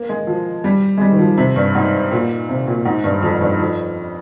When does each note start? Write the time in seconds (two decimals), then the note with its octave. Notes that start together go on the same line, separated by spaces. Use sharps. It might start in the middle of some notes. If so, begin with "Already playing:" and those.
Already playing: A#3
0.09 G#3
0.27 F3
0.64 G3
0.97 G#3
1.01 G3
1.11 D#3
1.19 F3
1.37 C3
1.56 G2
1.75 G#2
2.12 A#2
2.49 C3
2.67 A#2
2.85 G#2
3.04 G2
3.22 F2
3.41 G2
3.60 F2